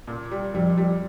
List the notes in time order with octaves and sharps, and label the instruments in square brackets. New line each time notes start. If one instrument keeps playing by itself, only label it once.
[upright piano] A#2
G3
[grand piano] F2 [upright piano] G3
[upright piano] G3